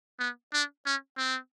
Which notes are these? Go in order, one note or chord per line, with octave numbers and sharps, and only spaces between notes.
B3
D4
C#4
C4